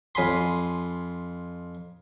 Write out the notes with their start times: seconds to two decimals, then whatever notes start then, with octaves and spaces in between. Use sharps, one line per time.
0.15 F2 G#5 B5 C6